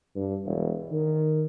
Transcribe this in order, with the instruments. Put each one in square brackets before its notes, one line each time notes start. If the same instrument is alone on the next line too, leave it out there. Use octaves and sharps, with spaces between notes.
[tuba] G2
E1
D#3